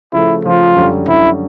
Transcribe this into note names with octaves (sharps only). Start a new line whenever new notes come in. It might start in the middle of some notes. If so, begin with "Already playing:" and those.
C#3 F3 A3 E4
C#3 F3 A3 F4
F#2 D3 G3
F#2 D3 G3 E4